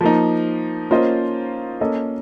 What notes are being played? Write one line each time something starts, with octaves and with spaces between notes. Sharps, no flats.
F3 A#3 D#4
A#3 C#4 F4 C5 D#5
A#3 C#4 A4 D#5